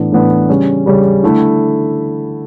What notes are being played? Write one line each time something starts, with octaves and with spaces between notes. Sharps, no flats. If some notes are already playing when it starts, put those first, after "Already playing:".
Already playing: A2 E3 B3 D4
A2 E3 B3 D4
C#3 G3 C#4
C#3 G3 C#4
D3 A3 E4